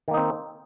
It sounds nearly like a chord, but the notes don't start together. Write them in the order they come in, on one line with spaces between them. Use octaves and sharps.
D#3 A#3 D#4 C4